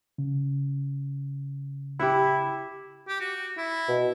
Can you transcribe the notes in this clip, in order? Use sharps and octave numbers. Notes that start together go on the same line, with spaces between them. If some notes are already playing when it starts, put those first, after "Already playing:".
C#3
E4 G4 E5 F#5
G4
F#4
E4
B2